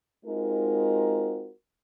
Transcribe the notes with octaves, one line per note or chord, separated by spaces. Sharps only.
G#3 C4 D#4 F4 F#4 A#4